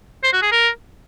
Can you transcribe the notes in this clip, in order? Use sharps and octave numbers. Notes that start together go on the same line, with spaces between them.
C5
F#4
G#4
A#4